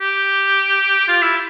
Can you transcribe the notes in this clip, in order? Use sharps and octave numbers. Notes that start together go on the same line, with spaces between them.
G4
F4
E4